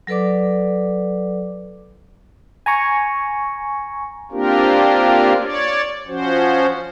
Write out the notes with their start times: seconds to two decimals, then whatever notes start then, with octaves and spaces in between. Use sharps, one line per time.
0.07 F#3 A4 B4 D5 D6
2.66 G#5 A#5 C#6
4.31 A#3 C4 D4 F4 G4 A#4
5.41 C#5 D5
6.07 F3 C#4 F#4 C5